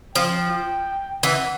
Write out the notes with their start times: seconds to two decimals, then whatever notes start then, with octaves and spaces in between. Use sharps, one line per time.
0.15 F3 G5
1.23 E3 F#5